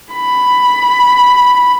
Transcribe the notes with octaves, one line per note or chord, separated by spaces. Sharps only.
B5